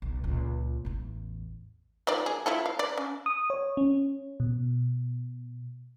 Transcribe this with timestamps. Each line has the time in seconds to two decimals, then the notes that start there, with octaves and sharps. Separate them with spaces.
0.02 B1
0.24 C#2 A#2
0.85 A1 E2
2.07 D#3 F3 D5
2.26 G#4
2.46 E4 F4 A4
2.66 F5
2.79 D5
2.97 C#4
3.26 D#6
3.50 C#5
3.77 C#4
4.40 B2